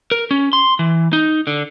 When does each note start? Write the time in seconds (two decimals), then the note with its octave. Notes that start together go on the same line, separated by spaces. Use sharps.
0.11 A#4
0.31 C#4
0.53 C6
0.79 E3
1.13 D#4
1.47 D3